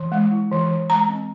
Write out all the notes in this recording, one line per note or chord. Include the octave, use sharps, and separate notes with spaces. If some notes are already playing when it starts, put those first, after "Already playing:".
Already playing: E3
G#3
E4
E3
E3
G#3 A#5
C4